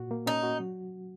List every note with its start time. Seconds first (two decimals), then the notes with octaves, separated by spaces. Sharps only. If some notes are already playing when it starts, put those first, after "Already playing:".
Already playing: A#2 F#4
0.11 A#3
0.26 C#4 D#4
0.43 F#4
0.60 F#3